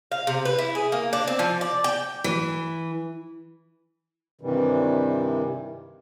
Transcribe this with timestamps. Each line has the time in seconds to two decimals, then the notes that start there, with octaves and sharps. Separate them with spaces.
0.12 F5
0.27 C3
0.45 B4
0.58 E4
0.75 G#4
0.92 A#3
1.13 D4
1.27 C4
1.39 F3
1.61 D5
1.84 G5
2.24 E3
4.41 G2 C3 D#3 E3 G3